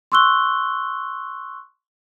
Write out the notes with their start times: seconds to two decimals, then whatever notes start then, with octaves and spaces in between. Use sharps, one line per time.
0.12 C6 C#6 E6 F#6 G7